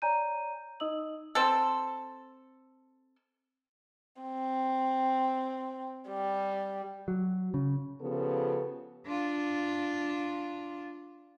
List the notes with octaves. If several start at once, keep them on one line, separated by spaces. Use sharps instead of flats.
C#5 D5 G#5 A#5 G6 D#7
D#4 D#5 D#6 E6 F#7
C4 A4
C4
G3
F#3
C#3
C#3 F3 B3 G4 A4
D4 F4